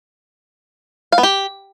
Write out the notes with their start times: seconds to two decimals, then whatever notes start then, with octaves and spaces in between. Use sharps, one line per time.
1.12 F5
1.18 B3
1.23 G4